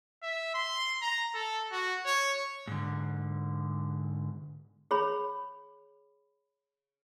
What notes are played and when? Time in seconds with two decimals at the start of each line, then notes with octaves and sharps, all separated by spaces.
0.23 E5
0.54 C6
1.02 A#5
1.34 A4
1.72 F#4
2.06 C#5
2.67 G#2 D3
4.91 G#4 C#5 B5